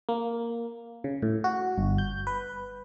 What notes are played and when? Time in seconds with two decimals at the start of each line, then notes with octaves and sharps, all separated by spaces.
0.09 A#3
1.04 C#3
1.22 A2
1.44 F#4
1.78 G1
1.98 G6
2.27 B4